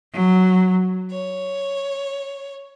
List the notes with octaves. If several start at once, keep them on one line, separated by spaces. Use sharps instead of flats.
F#3
C#5